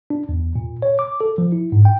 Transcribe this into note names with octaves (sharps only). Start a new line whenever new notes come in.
D4
E2
A#2
C#5
D6
A4
F3
E4
G#2
G5